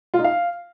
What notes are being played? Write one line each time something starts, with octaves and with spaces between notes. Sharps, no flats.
F4
D#4
F5